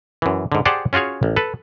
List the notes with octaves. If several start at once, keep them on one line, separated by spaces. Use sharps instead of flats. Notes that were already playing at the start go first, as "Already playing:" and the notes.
F#2 E3
G#2 D3
G4 G#4 C5 D5 F#5 A5
C#4 F4 F#4 G#4 C#5
A1
A4 B4